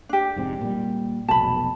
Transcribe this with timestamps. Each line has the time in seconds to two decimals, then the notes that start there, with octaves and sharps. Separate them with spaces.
0.09 D4 G4
0.36 F1 G#2 C4
0.61 A#2 G3
1.29 F1 B1 B2 A5 B5